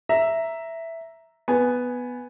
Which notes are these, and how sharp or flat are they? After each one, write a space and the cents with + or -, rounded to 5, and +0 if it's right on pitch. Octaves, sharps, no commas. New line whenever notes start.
E5 +0 A#5 +0
B3 +0 G#5 +0